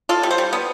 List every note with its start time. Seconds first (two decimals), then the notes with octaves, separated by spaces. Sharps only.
0.09 F4 A4
0.23 G3
0.31 C5
0.38 G3
0.53 B3